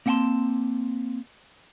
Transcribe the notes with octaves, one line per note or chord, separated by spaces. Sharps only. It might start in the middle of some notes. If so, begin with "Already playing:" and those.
A#3 C4 F#5 G5 A5 C6